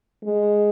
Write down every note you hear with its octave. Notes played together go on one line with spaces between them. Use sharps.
G#3